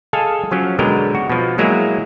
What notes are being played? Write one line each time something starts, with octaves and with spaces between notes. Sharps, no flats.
G#4 A4 D#5 F5 G#5 A5
F3 F#3 C#4
B2 D3 F#3 G#3 A#4 G5
F#4
B2 F3
F#3 G#3 A#3 E4 G#4 E5